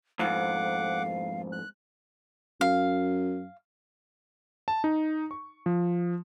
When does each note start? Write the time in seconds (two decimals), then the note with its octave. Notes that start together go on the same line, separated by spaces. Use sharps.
0.19 F2 G#2 F5 F#5 D6
1.52 F#6
2.61 F#2 F5
4.68 A5
4.84 D#4
5.31 C#6
5.66 F3